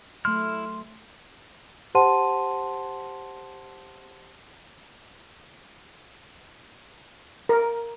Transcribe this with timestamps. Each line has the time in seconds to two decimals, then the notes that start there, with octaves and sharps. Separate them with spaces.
0.25 F#3 A3 E4 C6 F6
1.95 G4 C5 F#5 A5 C6 D#7
7.49 A#4